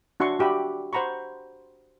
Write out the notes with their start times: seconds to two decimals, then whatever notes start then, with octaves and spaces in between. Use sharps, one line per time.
0.20 D4 F#4 E5 C6 C#6
0.39 F#4 G4 E5 B5
0.93 C5 F#5 A#5 B5 C#6